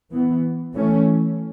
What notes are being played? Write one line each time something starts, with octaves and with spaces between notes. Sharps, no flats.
E3 B3
E3 A3 C#4